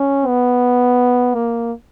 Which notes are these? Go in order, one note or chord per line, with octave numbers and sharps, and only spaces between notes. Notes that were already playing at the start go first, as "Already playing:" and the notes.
Already playing: C#4
B3
A#3